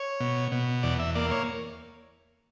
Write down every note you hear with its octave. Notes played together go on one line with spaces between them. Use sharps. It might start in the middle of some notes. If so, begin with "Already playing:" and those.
Already playing: C#5
B2
B2
E2 D5
E5
A#3 D5
C#5